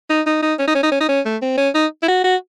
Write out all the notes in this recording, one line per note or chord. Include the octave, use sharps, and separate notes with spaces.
D#4
D#4
D#4
C#4
D#4
C#4
D#4
C#4
D#4
C#4
A3
C4
C#4
D#4
E4
F#4
F#4